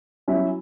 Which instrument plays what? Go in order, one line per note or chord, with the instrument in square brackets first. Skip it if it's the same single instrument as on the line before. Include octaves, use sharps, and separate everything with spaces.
[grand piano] F#3 C#4 E4